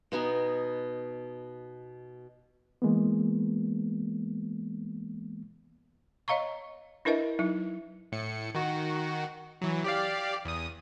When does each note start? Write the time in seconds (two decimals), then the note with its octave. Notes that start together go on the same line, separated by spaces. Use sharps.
0.12 B2 B3 D#4 G#5
2.82 E3 G#3 A#3 B3
6.28 C#5 D#5 F5 A#5 C#6
7.05 D4 E4 A#4 B4 D#5 E5
7.39 F#3 D#4 E4
8.12 A2 C#7
8.55 D#3 F#4
9.62 E3 F#3
9.84 G4 D5 F5
10.45 E2 D#6